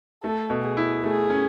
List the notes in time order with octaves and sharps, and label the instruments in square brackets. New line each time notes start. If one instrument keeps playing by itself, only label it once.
[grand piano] A3 [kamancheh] A4
[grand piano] B2
[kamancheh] G#4
[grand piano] E4
[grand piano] A3 [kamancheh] G#4
[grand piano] C#4